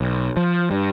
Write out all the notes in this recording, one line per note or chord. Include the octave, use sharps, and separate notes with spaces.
B1
F3
G2